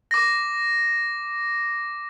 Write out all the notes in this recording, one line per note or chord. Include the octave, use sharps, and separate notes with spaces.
D6 A#6